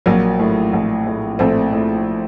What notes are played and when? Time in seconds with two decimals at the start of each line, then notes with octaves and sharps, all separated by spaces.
0.06 A#1 F#3 A#3
0.39 A2
0.73 A#1
1.07 A2
1.39 A#1 A3 C4
1.73 A2